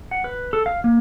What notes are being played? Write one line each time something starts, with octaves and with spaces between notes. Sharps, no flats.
F#5
B4
A4
F5
A#3